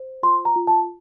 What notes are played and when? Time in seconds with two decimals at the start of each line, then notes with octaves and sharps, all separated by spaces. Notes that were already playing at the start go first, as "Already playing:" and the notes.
Already playing: C5
0.23 F4 C6
0.45 A#5
0.56 F4
0.67 A5